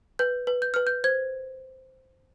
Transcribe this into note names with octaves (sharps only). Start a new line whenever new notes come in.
B4 G6
B4
G6
B4 F6
G6
C5 G#6